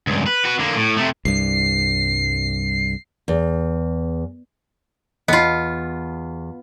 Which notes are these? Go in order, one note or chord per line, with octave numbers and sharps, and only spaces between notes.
C#2 G2
B4
F#4 B4
D3 A#3
A2
C3 A3
C2 G2 C7
E2
E2 B3 F4 D#5 B5